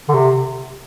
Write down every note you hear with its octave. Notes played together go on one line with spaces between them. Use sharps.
D3
C3